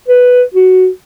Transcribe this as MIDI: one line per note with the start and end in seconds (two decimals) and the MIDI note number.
0.08 0.43 71
0.54 0.88 66